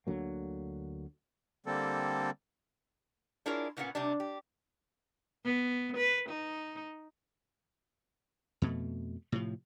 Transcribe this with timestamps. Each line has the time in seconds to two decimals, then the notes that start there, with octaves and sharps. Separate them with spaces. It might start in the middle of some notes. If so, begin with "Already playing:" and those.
0.07 D2 D3 F#3 A#3
1.66 D3 G3 A#3 C4 A4
3.46 D4 E4 F4 G#4 A#4 C#5
3.77 A#2 D#3 A#3 B3 C#4 F#5
3.95 C3 G3 D4
4.20 G4
5.45 B3
5.97 B4
6.29 D#4
8.62 F2 B2 A3
9.32 A2 C3 F3